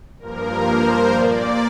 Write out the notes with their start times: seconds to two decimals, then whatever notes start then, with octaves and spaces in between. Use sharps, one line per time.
0.19 G2 F3 A#3 A#4
0.67 C5
1.13 A#2 A#3 D5